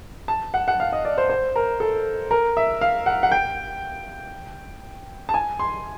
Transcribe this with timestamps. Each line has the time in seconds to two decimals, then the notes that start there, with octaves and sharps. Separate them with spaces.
0.28 A5
0.54 F#5
0.68 F#5
0.80 F5
0.92 D#5
1.05 D5
1.18 C5
1.29 C5
1.56 A#4
1.80 A4
2.31 A#4
2.57 E5
2.81 F5
3.06 F#5
3.23 F#5
3.31 G5
5.29 A5
5.34 G#5
5.59 C6